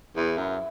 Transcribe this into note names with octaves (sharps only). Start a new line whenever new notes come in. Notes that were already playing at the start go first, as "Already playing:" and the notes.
E2 E4
F#2 E4